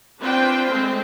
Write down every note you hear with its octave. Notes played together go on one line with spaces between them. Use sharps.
C4 D4 F4 B4 C5 G5
G#3 A3 C4